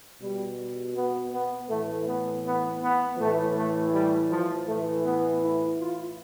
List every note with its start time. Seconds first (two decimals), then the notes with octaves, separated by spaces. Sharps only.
0.22 B2 G3
0.96 B3
1.33 B3
1.70 A2 E3 A3
2.07 B3
2.45 B3
2.82 B3
3.18 A2 E3 A3
3.56 A3
3.93 G3
4.30 F3
4.67 A2 E3 A3
5.04 B3
5.41 E4
5.79 F4